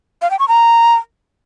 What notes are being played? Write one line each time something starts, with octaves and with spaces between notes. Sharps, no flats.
F5
G5
C#6
A#5